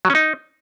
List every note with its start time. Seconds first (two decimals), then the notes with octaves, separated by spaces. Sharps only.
0.05 F#3
0.10 C#4
0.15 D#4